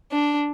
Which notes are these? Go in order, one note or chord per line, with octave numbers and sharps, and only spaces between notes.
D4